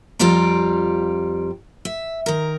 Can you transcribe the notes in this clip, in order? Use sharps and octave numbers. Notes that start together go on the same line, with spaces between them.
F2 G3 F4 G4 D5 A#5
E5
D#3 A#4